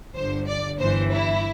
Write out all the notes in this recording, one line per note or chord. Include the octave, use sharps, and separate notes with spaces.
G1 G2 D3 C5
D5
G1 G2 E3 C5
E4